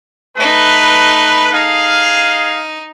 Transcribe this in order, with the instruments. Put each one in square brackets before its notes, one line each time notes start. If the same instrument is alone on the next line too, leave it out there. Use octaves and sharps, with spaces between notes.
[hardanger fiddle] A3 D#4 [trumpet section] B4
[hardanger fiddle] D#4 [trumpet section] G#4 F5